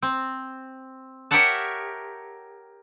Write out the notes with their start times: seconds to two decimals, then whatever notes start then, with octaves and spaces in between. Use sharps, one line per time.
0.02 C4
1.31 G4 A#4 C#5 E5 F#5 A5